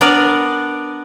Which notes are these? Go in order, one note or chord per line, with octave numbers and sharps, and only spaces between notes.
B3 D4 A#4 D5